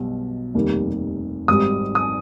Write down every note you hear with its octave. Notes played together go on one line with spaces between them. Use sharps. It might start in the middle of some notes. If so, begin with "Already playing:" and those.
Already playing: B1 B2 G3
F1 D#2 D#3 G3
G#1 G#2 G3 D#6
D#6